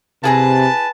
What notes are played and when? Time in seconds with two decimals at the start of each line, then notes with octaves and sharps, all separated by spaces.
0.24 C3 E4 G#4 B4 A5 A#5